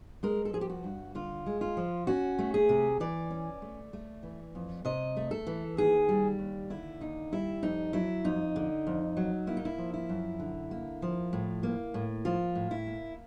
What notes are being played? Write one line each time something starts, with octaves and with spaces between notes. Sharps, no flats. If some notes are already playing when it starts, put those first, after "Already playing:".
G#3 A#4
A4
F3 G#4
G4
F#4
G2
D3 F4
G#3
F4
F3
C#4 F#4
A3
G#4
C3
E3 D5
C#4
A3
A3
E3
F2
C3 D#5
A3
A4
E3
D#2 G#4
G3
D#2
D3 E4
D#2 D#4
G3 E4
F2 D#4
F#3 E4
F2 D#4
D3
F2
F#3
A#3 E4
D#4
E4
F3
E4
F#2
D3
A#3
F3
A2
A#3
A2
F3 F4
A2
E4
A#3